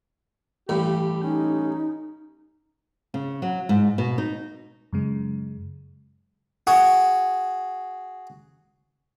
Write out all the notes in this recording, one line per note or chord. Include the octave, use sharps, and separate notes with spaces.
A1 G2 G4
C#4 D#4
C#3
F#3
G#2
B2
D#4
F#2 C#3 G#3
F#4 G#4